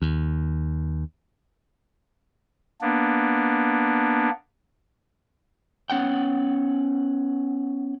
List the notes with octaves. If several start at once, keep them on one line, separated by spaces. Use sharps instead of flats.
D#2
A#3 B3 D4
B3 C#4 F#5 G5